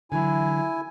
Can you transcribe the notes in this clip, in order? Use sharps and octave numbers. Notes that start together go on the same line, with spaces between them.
D3 E3 F#3 E4 G#5